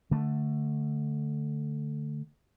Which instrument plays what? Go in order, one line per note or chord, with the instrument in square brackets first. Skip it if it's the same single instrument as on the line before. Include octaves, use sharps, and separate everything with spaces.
[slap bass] D3 A3